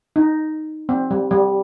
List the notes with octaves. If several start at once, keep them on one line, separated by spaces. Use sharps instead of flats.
D#4
C4
G3
G3